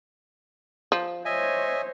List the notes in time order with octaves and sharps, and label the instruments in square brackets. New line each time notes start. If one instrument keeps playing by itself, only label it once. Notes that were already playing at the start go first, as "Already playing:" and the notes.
[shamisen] F3
[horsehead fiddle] C5 C#5 [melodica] D#5 E5 G#5